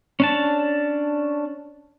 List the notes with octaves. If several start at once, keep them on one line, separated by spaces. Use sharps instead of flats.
C#4 D4 A5